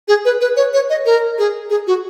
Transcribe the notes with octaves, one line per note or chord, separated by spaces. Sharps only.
G#4
B4
B4
C#5
C#5
D#5
A#4
G#4
G#4
F#4